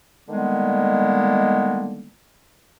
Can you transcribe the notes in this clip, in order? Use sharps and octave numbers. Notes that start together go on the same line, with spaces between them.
D3 D#3 G3 G#3 A#3 B3